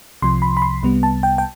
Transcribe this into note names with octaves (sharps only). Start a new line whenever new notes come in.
C2 C3 F3 C6
B5
B5
C6
C2 C3 G3 B3
A5
G5
G5